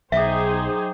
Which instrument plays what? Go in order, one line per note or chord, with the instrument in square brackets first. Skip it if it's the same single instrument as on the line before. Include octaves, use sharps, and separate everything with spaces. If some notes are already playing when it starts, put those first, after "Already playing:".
[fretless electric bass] B1 [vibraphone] F#3 G5 D6 [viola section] D#4 G#4 C5 [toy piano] E5